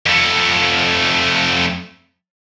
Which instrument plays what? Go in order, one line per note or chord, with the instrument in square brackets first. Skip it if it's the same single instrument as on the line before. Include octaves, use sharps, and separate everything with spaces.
[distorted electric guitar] F2 A3